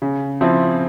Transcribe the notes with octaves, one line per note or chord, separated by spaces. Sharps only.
C#3
F3 C4 E4